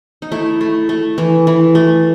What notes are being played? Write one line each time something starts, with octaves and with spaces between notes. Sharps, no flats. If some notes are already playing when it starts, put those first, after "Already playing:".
D#4
A3 E4
A3
A3
E3
E3
A3